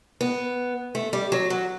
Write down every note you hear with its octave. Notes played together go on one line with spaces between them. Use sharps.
B3
A3
G3
F#3
F#3